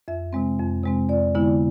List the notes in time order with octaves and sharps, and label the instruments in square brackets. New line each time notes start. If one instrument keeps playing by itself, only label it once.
[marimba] F2 E5
C3 G#3 C4
F2
C3 G#3 C4
F2 D5
D3 G#3 B3 E4